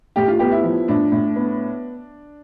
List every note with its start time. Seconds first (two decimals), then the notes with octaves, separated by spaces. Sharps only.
0.16 A2 G4
0.28 F4
0.39 B3 G4
0.52 E4
0.64 F3
0.88 A2 D4
1.12 A2
1.36 B3